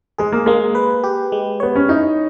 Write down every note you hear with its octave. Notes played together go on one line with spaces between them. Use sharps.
G#3 G#4
A#3
G#3 A#3
B4
G4
G#3
B3 C#5
C#4
D#4 E4